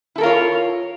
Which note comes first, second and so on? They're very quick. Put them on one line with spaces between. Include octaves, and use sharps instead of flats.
E4 A4 A#4 F4 C#5